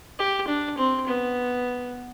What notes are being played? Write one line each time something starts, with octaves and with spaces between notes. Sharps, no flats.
G4
D4
C4
B3